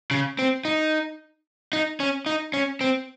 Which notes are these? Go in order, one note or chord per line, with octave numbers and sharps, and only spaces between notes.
C#3
C4
D#4
D#4
C#4
D#4
C#4
C4